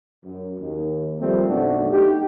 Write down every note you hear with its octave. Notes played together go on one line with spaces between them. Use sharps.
F#2
D#2
F3 G3 A3 A#3 C4
B1 F#2 A3 D4 F#4
A3 D#4 G4